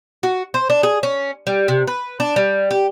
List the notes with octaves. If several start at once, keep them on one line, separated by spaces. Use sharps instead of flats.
F#4
C5
D4
G#4
C#4
G3
C3
B4
D4
G3
G4